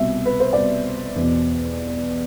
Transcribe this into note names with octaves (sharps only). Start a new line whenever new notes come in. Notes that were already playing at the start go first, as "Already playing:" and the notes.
Already playing: C2 B2 E5
B4
C5
C2 B2 D5
E2 B2